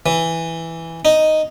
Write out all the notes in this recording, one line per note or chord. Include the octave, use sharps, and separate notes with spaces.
E3
D#4